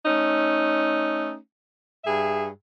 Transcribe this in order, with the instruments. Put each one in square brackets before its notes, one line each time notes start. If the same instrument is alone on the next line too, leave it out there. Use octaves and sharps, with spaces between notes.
[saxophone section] A3 C#4 D#4
G2 G#4 E5